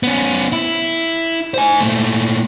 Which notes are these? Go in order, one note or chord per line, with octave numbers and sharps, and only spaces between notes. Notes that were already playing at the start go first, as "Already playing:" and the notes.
B3 C#4
E4
C5 G#5
A#2 A3